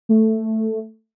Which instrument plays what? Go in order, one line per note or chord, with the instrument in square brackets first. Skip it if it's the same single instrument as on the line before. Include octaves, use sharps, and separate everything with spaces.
[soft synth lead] A3